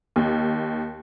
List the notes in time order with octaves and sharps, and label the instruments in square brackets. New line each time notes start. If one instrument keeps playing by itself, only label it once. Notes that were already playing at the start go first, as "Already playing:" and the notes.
[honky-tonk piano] D#2